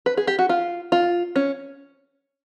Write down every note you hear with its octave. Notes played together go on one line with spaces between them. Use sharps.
B4
G#4
G4
F#4
F4
F4
C#4